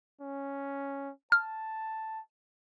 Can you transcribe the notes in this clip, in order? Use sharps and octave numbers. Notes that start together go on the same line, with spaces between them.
C#4
A5 F6